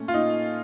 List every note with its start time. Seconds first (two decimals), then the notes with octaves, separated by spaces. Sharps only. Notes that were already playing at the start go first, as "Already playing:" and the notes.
Already playing: A#2 A3 C#4
0.08 F4
0.14 A#2 D#4